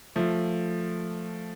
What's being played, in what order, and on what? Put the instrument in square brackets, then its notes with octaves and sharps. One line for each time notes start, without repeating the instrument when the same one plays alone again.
[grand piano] F3 A3